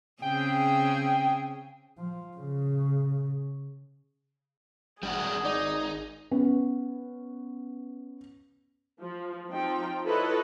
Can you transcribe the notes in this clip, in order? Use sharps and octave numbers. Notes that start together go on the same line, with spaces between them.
C#3 C4 G#4 G5
F3
C#3
G#1 G3 D4 F#4 G#4
D#4 D5
B3 C#4
F3
F3 C4 D#4 G5
E4 F4 A4 B4 C#5 D#5